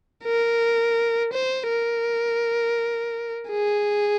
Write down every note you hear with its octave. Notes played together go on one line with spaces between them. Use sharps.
A#4
C5
A#4
G#4